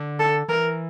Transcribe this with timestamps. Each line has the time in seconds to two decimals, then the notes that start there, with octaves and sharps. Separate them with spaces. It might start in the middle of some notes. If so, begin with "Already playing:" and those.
Already playing: D3
0.19 A4
0.49 E3 A#4